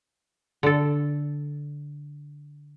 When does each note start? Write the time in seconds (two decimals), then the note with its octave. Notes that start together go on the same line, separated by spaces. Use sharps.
0.63 D3 A4